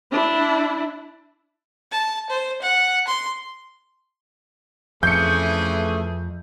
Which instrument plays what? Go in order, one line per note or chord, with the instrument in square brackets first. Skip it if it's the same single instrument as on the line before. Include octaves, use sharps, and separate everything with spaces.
[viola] D4 E4
[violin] A5
C5
F#5
C6
[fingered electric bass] F2 [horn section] C#3 E3 G#4 [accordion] A3 [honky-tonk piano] G6 C#7